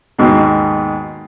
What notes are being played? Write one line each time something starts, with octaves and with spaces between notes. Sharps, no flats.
D#2 G#2 B2